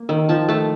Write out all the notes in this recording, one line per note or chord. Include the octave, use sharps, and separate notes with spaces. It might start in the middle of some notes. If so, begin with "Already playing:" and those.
Already playing: A#3
D#3
F3 A5
A3 A5